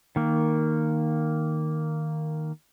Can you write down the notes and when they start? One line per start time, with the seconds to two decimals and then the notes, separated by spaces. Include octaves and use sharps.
0.16 D#3 A#3